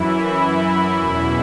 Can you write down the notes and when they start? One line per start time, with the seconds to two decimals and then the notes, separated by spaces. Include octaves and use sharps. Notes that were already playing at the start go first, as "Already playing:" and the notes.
Already playing: F#2 E3 E4
0.28 E4
0.96 E2 B2